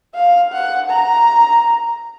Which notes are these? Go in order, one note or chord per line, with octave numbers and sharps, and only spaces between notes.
F5
F#5
A#5